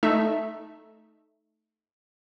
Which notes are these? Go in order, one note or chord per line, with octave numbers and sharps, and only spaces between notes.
A3 D#4 E5